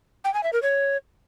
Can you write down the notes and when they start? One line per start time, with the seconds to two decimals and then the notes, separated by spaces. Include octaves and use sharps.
0.24 G5
0.34 G#5
0.43 E5
0.53 A#4
0.62 C#5